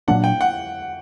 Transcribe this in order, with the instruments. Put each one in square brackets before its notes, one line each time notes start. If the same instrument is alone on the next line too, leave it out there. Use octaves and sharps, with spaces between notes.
[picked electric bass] A#2 F#3 A#3 D4 [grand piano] F#5
[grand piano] G5
F#5